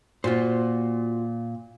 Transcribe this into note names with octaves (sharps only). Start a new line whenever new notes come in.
A#2 F4 F#4 C5